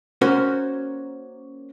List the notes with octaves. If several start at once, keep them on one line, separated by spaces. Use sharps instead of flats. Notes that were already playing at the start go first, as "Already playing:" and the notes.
A#3 C#4 F#4 A#4 C5